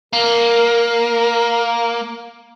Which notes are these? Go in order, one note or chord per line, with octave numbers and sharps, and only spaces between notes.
A#3 A#4